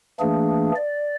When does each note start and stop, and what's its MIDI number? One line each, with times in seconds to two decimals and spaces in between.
0.20 0.72 52
0.20 0.72 57
0.20 0.72 58
0.20 0.72 62
0.20 0.72 68
0.76 1.16 74